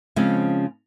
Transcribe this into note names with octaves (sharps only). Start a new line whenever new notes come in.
C#3 F3 G#3 C4 C#4